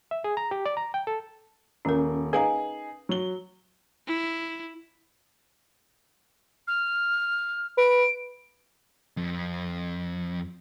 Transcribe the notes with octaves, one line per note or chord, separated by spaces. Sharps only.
E5
G#4
A#5
G4
D5
A#5
G5
A4
D#1 C#4 A#4
D#4 G#4 B4 F5 A#5
F#3 G7
E4
F6
B4 D7
F2